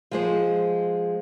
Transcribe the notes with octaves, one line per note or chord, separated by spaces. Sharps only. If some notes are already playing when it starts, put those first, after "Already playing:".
F3 G#3 C5